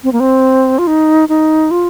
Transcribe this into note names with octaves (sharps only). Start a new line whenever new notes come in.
C4
A#3
C4
F4
D#4
D#4
F4